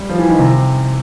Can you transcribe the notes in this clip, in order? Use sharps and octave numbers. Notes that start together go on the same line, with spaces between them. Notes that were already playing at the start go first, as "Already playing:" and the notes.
Already playing: G3
F3
E3
D#3
C3